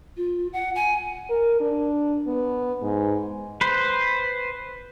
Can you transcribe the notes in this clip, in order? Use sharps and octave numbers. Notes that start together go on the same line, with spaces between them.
F4
F#5
G#5
A#4
D4
B3
G#2
B4 C5